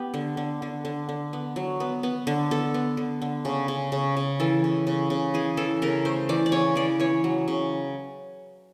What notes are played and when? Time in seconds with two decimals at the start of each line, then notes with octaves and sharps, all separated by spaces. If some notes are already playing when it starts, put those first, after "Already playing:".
Already playing: B3 G4
0.14 D3
0.37 D3
0.62 D3
0.85 D3
1.09 D3
1.33 B3
1.56 F#3
1.80 B3
2.03 B3
2.27 D3
2.51 B3 A4
2.74 B3
2.97 D3
3.22 D3
3.45 C#3
3.68 C#3
3.92 C#3
4.17 C#3
4.40 E3 A4
4.64 C#3
4.87 C#3
5.10 C#3
5.34 E3 G#4
5.57 E3 A4
5.82 C#3 A#4
6.05 A3 C5
6.29 E3 D5
6.46 D5
6.52 C#3 C#5
6.75 E3 D5
7.00 E3 C#5
7.24 F#3
7.48 C#3